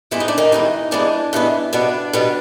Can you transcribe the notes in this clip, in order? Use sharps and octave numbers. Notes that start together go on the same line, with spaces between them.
G2 E3 G#3 B3 E4
D#4
D4
D#3 D#4
G2 E3 G#3 B3
G2 E3 G#3 B3 D4
G2 E3 G#3 B3
B2 G3 B3 D4
B2 G3 B3